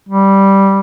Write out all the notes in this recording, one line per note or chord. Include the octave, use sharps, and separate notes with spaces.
G3